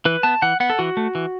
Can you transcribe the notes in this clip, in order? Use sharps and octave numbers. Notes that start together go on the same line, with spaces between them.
E3 B4
B3 A5
E3 F#5
B3 F#5
A4
E3 F#4
A3
E3